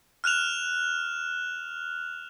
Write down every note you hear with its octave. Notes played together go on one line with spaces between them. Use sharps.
F6 F#6 E7 F7